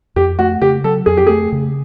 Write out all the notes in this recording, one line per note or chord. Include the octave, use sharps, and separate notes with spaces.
F2 G4
A3 F#4
C#3 G4
F#3 A4
F2 G#4
G4
A3 G#4
C#3